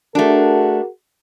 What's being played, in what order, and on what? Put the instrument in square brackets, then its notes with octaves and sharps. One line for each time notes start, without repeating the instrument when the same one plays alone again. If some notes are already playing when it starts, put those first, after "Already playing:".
[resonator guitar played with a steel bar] A3 D4 [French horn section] F#4 G#4 A#4